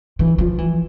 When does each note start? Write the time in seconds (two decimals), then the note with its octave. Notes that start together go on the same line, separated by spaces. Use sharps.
0.19 E3
0.38 F3
0.58 E3